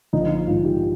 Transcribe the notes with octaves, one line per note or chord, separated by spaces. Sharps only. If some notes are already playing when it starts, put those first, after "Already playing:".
A#1 D#4
F4
G#2 D#3 F4
G4